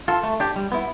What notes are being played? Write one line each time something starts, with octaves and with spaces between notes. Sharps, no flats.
F4 A4
A3
D4 G4
G3
B3 E4